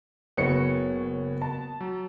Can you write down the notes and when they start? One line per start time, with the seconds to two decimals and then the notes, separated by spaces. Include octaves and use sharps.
0.37 F#1 B3 F#4 C#5 C#7
1.42 A5
1.81 F#3